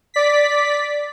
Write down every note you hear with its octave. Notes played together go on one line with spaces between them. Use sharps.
D5 B6